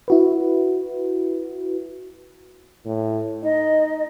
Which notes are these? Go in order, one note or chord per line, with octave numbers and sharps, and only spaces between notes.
E4 F#4 B4
A2
D#4 D#5